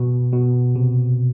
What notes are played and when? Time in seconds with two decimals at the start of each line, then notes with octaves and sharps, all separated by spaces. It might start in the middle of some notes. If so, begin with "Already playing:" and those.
Already playing: B2
0.33 B2
0.75 C3